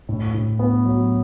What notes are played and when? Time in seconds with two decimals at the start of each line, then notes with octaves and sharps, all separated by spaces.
0.09 A2
0.34 A2
0.59 B3
0.85 F#3